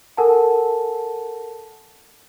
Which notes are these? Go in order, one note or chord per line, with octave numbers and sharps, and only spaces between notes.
A4 A#4 F#5 G#5 A5